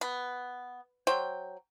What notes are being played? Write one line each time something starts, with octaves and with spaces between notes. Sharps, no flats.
B3
F#3 C5 G5